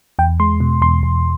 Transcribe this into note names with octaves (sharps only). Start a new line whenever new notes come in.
E2 G5
G#3 C6
B2
E2 C6
E2